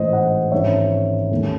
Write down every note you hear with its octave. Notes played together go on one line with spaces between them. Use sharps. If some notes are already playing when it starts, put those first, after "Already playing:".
Already playing: A1 G#2 E3 C5 D#5
D#5 F#5
G#1 G#2 E3 G#3 C#4 C#5 E5
D#2 D#3 A3 C#4